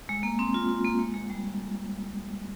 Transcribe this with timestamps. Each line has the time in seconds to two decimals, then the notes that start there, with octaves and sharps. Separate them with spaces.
0.09 G#3
0.23 A#3
0.39 C4
0.54 F4
0.69 F4
0.84 A#3
0.99 G#3
1.14 G#3
1.30 G3